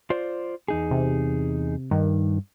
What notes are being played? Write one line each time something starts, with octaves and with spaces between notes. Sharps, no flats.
F4 C5 D5
E2 D#4 G#4
C3
G2 D#3